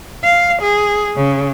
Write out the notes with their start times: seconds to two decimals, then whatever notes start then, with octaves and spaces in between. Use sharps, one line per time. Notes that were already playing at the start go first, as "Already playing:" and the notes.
0.24 F5
0.62 G#4
1.17 C#3